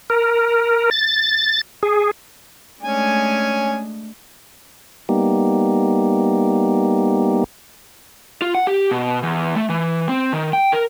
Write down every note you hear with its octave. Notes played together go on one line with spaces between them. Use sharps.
A#4
A6
G#4
G#3 A3 C#4 D4 G#5
G3 A#3 B3 D#4 G4
F4
F#5
G4
B2
E2
A3
E3
C4
D#3
G5
A#4